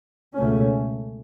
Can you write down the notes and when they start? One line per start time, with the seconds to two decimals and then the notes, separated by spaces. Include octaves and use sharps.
0.35 C#2 B2 A3 C#4